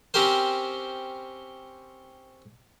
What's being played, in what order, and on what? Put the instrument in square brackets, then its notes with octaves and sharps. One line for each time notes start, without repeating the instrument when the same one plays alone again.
[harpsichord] C4 C#4 G4 A#4 C5